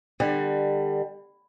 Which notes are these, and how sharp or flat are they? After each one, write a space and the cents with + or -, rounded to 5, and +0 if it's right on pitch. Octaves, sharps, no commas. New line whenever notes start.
D3 +35 G3 +25